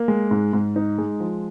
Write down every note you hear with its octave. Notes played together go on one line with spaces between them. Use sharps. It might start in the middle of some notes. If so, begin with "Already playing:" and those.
Already playing: A#3
G#3
G#2
G#2
D#4
G#3
F3